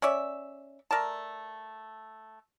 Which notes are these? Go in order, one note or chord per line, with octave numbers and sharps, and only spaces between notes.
C#4 D5 E5
A3 A#4 D5 A5